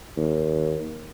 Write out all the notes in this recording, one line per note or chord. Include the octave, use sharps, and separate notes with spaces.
D#2